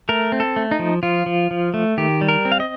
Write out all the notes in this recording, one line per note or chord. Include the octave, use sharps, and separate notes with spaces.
A3 A#4
C4
A4
A3
D#4
F3
F3 F4
F3
F3
A3
D#3 G4
G3
A#4
C4
F5
D#5